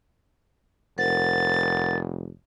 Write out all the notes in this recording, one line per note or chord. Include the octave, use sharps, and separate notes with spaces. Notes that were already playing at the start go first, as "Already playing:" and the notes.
F1 A#4 C5 F#5 A6